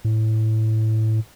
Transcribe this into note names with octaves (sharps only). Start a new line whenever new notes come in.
A2